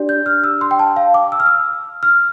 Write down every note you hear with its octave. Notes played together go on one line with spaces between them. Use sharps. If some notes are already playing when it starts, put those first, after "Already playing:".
Already playing: D4 G4 D5
G6
F6
E6
C6
G5
A5
F5
D6
E6
F6
E6
F6